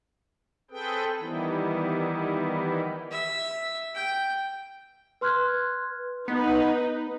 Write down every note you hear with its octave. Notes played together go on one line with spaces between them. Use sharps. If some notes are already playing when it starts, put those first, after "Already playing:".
C4 G#4 A4 B4 G5
D#3 E3 G3 B3 D#4 E4
E5
G5
B4 C6 F6 F#6 G#6
B3 D#4 B4